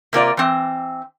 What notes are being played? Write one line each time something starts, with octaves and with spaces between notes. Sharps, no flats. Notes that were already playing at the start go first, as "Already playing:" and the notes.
C3 A#3 F4 D5
E3 C4